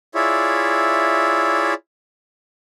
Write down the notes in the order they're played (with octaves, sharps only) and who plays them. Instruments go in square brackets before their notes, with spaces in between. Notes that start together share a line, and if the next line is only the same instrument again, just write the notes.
[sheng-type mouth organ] E4 F4 G#4 C#5 D5 E5